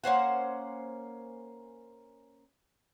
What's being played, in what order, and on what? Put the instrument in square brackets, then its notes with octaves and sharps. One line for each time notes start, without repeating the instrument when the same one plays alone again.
[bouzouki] A#3 C#4 C5 F#5